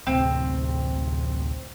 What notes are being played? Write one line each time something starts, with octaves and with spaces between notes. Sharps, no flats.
A1 D2 C3 C4